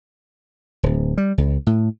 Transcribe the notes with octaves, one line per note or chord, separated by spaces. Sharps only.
D1
G3
C#2
A2